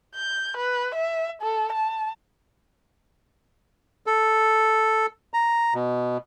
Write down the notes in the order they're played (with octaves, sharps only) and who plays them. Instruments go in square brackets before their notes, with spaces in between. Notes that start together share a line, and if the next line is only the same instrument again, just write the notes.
[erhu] G6
B4
E5
A4
A5
[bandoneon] A4
A#5
B2